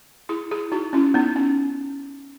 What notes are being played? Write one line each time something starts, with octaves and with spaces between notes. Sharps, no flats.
E4 G#4
E4 G#4
D#4 F#4
C#4 E4
B3 D#4
C#4